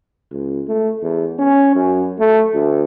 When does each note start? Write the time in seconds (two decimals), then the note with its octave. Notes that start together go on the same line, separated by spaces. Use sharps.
0.31 C#2
0.68 A3
1.02 E2
1.39 C#4
1.75 F#2
2.19 A3
2.54 D2